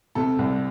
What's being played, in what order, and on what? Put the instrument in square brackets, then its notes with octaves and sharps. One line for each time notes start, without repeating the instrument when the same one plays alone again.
[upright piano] C3 A4
C2